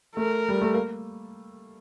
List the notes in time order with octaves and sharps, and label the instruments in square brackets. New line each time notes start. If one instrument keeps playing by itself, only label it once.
[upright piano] A3 [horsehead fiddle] A#4
[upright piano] G3
A3
A#3